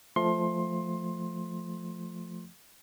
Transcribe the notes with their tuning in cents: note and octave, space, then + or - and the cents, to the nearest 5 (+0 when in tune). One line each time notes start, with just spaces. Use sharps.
F3 +0 A3 +0 C6 +20